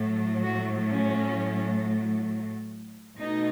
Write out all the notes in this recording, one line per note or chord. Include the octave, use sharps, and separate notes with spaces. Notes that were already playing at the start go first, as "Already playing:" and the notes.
Already playing: A2 F#3 A3
F#4
C#4
B2 A3 D#4